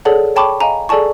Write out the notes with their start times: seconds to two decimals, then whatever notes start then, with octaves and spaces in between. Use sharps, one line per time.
0.05 G#4 A4 C#5 D5 F#5 A5
0.36 C#5 G5 A5 B5 C#6 D6
0.61 D#5 F5 G#5 A#5
0.89 G#4 A4 D5 G#5 A5 C#6